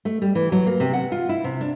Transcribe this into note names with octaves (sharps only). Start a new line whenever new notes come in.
A3
G3
E3
F#3
A#3
C3
F#5
F4
E4
C3
D4